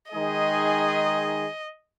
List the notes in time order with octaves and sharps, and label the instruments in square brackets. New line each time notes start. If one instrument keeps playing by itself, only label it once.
[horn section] D#3 G#3 D#4 G#4 [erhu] D#5